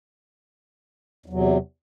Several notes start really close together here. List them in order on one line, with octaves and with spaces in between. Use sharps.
E2 F#3 C3